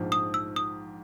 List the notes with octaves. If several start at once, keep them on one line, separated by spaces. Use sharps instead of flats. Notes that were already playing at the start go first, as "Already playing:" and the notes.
Already playing: A#1 G#2 F3
D#6
E6
D#6